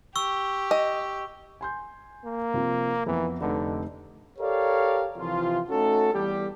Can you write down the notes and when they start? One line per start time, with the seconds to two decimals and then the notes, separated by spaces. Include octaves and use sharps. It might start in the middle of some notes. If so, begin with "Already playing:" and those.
0.16 G4 C#6 E6
0.71 D#5
1.61 G#5 C6 G6
2.24 A#3
2.54 C3 F3 C4
3.06 F2 E3 B3
3.41 F1 D3 D#4 B4
4.39 G4 A4 A#4 C#5 D5 F5
5.17 C3 E3 F3 F4
5.70 A3 C#4 D#4 F#4 A4
6.13 E2 G3 G4